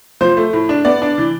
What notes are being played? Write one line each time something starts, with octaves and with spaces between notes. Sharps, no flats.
F3 C5
A3
A2
D4
B3 D5
D4
E3